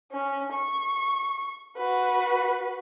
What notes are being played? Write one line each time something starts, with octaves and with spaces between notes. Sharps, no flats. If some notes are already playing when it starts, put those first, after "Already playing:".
C#4
C#6
F#4 B4